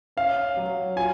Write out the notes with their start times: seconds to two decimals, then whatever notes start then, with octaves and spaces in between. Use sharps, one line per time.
0.17 C#4 F5
0.57 F#3
0.96 F4 G#5